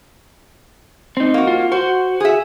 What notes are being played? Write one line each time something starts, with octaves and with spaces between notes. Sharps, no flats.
C4 D#4
A#3 F#4
F4
F#4 C5
G#4 E5